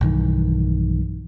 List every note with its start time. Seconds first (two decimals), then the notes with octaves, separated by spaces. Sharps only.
0.01 B1 G2 D#3 E3